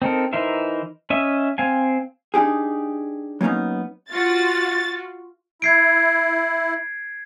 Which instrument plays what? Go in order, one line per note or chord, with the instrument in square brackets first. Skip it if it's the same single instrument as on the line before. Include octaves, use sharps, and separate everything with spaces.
[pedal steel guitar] C4 D#4 A4 A#4
E3 D#4 A#4 C5 E5
C#4 D#5 E5
C4 F5 G#5
[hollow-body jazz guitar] D4 D#4 G4 G#4
F#3 A#3 B3 C#4 D#4
[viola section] F4 F#4 [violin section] A6
[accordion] E4 [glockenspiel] G#6 C7 D7